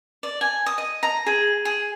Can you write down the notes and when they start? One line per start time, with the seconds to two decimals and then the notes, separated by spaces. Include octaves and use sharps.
0.23 D5
0.41 G#5
0.66 D#6
0.78 D#5
1.03 A#5
1.26 G#4
1.65 G#4